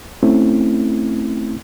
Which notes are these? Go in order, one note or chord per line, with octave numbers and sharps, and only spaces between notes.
A3 C4 C#4 E4